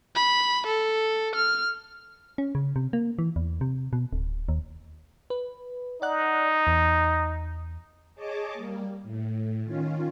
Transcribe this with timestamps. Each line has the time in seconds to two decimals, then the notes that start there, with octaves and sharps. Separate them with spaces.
0.15 B5
0.67 A4
1.35 F6
2.38 C#4
2.55 C#3
2.76 C3
2.93 A#3
3.19 E3
3.36 E2
3.61 C3
3.93 B2
4.13 D1
4.49 D#2
5.30 B4
6.02 D#4 D5 F#5 F#6
6.67 E2
8.15 G#4 C#5 D#5 A5 D6
8.53 G3 A#3
9.03 A2
9.64 D#3 C#4 F4